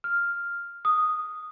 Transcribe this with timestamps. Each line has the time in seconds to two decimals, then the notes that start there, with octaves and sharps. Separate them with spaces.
0.04 F6
0.85 D#6